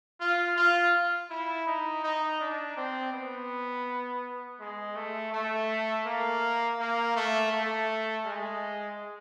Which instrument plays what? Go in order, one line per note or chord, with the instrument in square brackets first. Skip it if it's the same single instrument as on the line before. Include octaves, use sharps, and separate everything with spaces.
[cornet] F4
F4
E4
D#4
D#4
D4
C4
B3
G#3
A3
A3
A#3
A#3
A3
A3
G#3